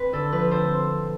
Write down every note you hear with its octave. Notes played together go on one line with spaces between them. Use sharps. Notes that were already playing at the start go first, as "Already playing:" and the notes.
Already playing: C4 B4
D3 A4
F3 B4
C4 A4 C5